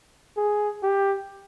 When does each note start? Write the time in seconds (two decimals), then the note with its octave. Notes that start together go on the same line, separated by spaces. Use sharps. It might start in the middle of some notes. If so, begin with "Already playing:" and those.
0.37 G#4
0.83 G4